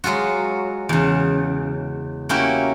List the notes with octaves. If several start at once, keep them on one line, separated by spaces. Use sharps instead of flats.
F#3 G#3 F4 F#4
E2 C#3
A#3 C#4 E4 F#4 G4 A#4